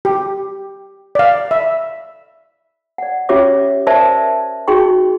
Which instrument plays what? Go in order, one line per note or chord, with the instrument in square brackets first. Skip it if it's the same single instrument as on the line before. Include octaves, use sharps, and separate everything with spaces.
[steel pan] G4
D5 F5
E5
[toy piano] D5 F#5
C#4 F4 G4 C#5 E5 D6
A#4 C5 D5 E5 A5
D#4 F#4 G#4 G5 C6 C#6